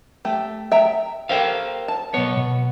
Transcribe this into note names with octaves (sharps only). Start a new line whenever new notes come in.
A3 G4
E5 G5 A#5
G4 A4 A#4 C5 F5
A5
B1 B3 C#5
B2